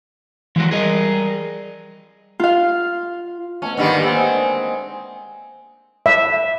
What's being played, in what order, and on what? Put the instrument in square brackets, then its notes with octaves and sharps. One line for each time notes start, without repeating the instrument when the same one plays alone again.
[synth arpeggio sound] E3 [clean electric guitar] F3 G#3 F#4
[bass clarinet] G3 [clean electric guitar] G#4 A#4 D#5
[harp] F4 F5
[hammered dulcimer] B2 A3 [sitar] C#4
[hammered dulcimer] G#2 A#3 B5 [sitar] D3 D#3 G3
[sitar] C4 [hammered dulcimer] D#5 F#5 G#5
[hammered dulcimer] G#4
[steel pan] E5